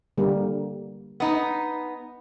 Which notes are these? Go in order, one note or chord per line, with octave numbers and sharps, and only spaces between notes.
D3 G3 A#3
B3 D#4